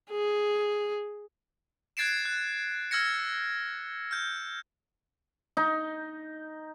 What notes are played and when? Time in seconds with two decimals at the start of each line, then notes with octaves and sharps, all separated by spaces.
0.10 G#4
1.97 F#6 G#6 A6 C7 D7 E7
2.25 F#6
2.91 E6 F6 G#6 A#6 C#7
4.11 F6 G6
5.57 D#4